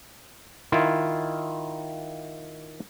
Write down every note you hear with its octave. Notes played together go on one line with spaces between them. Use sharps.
D#3 E4 F4